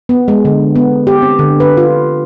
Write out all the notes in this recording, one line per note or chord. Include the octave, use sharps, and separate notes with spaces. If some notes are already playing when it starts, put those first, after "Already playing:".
B3
G#3
D3
B3
G4
C4
D3
B4
F4